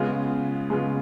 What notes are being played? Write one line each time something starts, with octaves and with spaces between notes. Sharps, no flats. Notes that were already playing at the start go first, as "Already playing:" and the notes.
Already playing: C#3 G#3 B3 F4
C#3 G#3 B3 F4